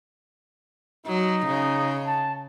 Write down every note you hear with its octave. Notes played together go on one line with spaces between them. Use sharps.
F#3 D#4
C#3
A5